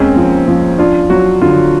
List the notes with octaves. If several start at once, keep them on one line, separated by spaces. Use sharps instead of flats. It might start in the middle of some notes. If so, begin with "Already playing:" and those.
Already playing: D#2 G#3 C4 C#4
F3
F3
D4 F4
F#3 F#4
D3 F4